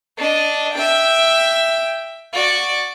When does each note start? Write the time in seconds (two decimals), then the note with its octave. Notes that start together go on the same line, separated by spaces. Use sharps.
0.18 D4 D#5
0.74 E5 G5
2.33 F#4 D5